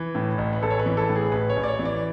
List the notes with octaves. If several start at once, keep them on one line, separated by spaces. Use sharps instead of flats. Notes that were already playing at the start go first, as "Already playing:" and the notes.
Already playing: E3
A2
A1
B4
A1 A4
C#5
B4
E3
A4
A2
G#4
A1 B4
C#5
A1
D5
C#5
E3
D5